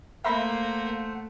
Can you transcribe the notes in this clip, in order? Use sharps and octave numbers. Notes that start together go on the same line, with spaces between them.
A3 A#3 C5 E5 F#5 A#5 B5